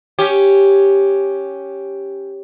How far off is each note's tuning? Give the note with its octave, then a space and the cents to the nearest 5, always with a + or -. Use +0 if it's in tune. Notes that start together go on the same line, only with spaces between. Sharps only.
C#4 +0 G4 +0